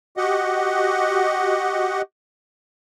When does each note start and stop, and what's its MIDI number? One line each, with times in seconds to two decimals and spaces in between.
0.17 2.02 66
0.17 2.02 67
0.17 2.02 75
0.17 2.02 78